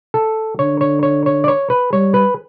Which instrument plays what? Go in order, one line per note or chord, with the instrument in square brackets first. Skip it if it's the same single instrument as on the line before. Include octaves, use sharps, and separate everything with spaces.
[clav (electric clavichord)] A4
[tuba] D3 [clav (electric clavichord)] C#5
[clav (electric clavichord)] C#5
C#5
C#5
D5
C#5
B4
[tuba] G3 [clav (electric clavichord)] C#5
[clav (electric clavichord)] B4